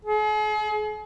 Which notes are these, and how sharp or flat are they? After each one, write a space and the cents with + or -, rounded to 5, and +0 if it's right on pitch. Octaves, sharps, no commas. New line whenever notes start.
G#4 +40